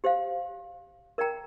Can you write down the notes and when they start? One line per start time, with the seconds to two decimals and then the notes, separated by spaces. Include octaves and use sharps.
0.04 G4 C5 F5
1.18 A#4 D5 G5 A#5